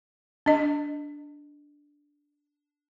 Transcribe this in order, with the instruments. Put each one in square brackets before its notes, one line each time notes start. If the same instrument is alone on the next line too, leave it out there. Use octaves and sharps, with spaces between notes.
[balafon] D4 D#5